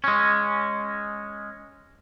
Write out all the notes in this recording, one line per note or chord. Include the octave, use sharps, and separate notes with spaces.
G#3 C#4